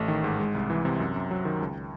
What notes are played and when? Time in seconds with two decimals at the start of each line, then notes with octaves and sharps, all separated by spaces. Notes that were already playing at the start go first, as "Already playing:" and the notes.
Already playing: A1 A3
0.08 D#3
0.24 G#2
0.40 G#3
0.55 C2
0.70 E3
0.85 C3
1.00 F#2
1.16 F#2
1.31 F#3
1.45 D#3
1.61 C#2